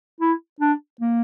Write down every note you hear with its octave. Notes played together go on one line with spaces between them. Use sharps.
E4
D4
A#3